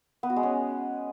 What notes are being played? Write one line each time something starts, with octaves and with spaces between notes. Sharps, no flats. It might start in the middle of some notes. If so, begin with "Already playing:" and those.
B3
F#4
G#3
C#4